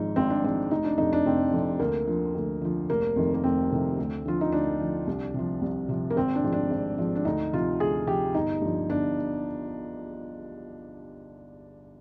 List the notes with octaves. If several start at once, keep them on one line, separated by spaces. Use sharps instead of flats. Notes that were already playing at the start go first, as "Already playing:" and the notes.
Already playing: G#1 G#2 F3 D#4
G#1 C4
D4
G#2 F3 C4
F1 D#4
D4
F2 C3 D#4
D4
F1 C4
F2 C3
D2 A#3
D3 F3
D2
D3 F3
F1 A#3
F2 C3 D#3
A#3
F1 C4
F2 C3 D#3
D2
D3 F3 F4
D#4
D2 D4
D3 F3
C2
C3 F3
C2
C3 F3
A#3
G#1 C4
D4
G#2 F3
D4
G#1
G#2 F3
D4
D2 D#4
C3 F3 F4
D2 G#4
C3 F3 G4
G1 D#4
G2 F3
G1 D4